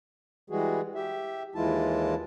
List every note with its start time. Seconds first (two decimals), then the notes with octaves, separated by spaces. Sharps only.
0.50 E3 G3 G#3 F#4 G#4
0.95 G4 E5
1.55 D#2 E3 G#3 E4 F4 A5